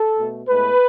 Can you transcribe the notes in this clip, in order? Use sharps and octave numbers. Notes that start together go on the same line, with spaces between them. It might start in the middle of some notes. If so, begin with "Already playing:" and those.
Already playing: A4
B2 A3
A2 G#3 B3 B4